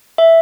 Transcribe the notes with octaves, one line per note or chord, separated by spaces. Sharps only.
E5